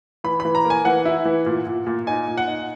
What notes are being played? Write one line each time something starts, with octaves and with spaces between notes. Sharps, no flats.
E3 B5
E3 B5
A#5
A#3
G#5
E3 F#5
E4
E3
A#2
A#2
A#2
D#4 G#5
A#2
F#5
D#4